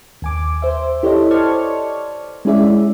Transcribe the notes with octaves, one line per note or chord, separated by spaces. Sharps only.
D#2 G#5 D6
C5 E5
E4 G4 A4 C5 C#5 D#5
C5 D5 A5 C#6 F6 G#6
G#3 C#4 E4 G#4 D5 E5